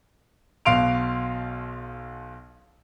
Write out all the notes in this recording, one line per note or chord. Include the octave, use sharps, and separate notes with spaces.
B1 B2 F5 C6 D7 F7